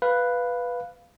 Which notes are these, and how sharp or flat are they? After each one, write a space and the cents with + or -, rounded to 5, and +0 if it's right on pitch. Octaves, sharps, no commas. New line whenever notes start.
B4 +0 F5 +0